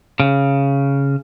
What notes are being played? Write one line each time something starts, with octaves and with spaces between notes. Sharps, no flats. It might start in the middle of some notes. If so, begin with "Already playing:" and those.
C#3